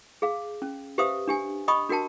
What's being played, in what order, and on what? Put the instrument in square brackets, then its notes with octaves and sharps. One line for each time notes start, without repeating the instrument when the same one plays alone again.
[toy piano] G#4 F5
C#4
G4 B4 C5 E5 F5 D#6
D4 G4 G#5
D#5 G5 B5 C#6 D#6
D4 F#4 A#4 G5 A5